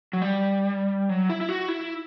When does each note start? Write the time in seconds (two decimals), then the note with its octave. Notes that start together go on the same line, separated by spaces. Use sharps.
0.13 F#3
0.22 G3
1.09 F#3
1.30 E4
1.41 E4
1.49 F#4
1.68 E4